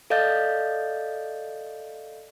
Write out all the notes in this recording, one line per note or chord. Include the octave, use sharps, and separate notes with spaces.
A4 D5 D#5 F5 G6 A6